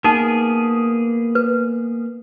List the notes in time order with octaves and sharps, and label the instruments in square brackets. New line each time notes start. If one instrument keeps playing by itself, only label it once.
[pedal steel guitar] A#3 B3 G#4 [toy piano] D#4
[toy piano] B4